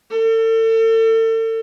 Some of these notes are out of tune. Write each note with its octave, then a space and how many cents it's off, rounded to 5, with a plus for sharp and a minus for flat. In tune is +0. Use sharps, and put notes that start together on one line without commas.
A4 +40